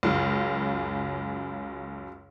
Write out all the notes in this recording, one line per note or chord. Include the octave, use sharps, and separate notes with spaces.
C#2 F#2 C#3